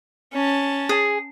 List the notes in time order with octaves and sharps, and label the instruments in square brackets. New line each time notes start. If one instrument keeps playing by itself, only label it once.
[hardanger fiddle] C#4 A5
[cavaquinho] G#4